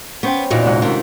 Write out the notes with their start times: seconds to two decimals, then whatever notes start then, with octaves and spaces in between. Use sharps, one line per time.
0.23 B3 C#4 C5 G5
0.50 E2 A#2 D#4 F#4
0.65 G#2 C3 F#5
0.82 D#3 A3 D4 F4